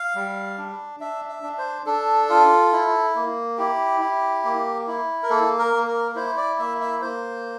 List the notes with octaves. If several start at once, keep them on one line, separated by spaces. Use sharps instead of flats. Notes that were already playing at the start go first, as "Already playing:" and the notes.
Already playing: F5
G3
D4
D4 E5
E5
D4
C5
D4 A4
F4
E4
A#3
E4 G4
E4
A#3
E4
A#4
A#3 A4
A#4
A#3
A#4
E4 C5
D5
A#3 E5
E5
A#3 C5